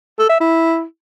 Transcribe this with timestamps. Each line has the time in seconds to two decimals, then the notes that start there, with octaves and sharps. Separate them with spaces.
0.19 A4
0.29 E5
0.40 E4